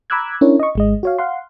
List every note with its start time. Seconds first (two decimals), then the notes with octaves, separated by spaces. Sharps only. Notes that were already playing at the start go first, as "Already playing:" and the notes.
0.10 A#5 B5 D6 E6 F#6 G#6
0.41 C#4 D4 E4 A#4 C#5
0.60 D#5 C#6
0.75 G#1 G#3 D#5
1.03 F#4 C#5 F5
1.19 F5 F#5 C6